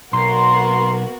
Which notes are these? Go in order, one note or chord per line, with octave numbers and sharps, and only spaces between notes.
B1 A#3 B3 F#4 A#5 C6